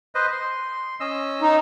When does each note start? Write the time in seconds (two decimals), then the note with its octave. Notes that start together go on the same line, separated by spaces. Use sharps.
0.15 B4 C5 D#5
0.32 C6
1.00 C#4 D#5 E6
1.42 D#4